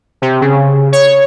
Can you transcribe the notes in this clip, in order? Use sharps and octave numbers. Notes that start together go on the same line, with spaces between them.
C3
C#3
C#5